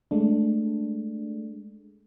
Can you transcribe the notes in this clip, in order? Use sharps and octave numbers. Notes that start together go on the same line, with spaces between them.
G#3 A3 D4